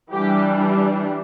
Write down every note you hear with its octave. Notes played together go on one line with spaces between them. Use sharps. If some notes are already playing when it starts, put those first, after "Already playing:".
E3 G3 D4 G4